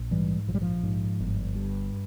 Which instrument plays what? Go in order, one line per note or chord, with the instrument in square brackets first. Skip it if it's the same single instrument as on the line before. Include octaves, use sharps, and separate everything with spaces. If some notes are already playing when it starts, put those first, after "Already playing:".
Already playing: [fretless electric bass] A#1
G#2 E3 G3
A#1 F3
G3
F3
G#2
G1
G2